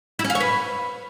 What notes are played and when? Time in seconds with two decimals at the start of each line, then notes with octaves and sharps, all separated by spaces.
0.19 E4
0.24 C#4
0.30 F5
0.35 C#5
0.40 B4